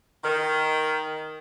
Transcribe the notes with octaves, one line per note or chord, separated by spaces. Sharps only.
D#3